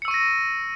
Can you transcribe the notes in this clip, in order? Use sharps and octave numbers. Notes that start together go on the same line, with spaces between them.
C#6 E6 A#6 C#7 D#7